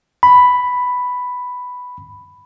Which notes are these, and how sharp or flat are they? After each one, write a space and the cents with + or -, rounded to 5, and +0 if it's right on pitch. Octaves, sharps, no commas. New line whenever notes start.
B5 +5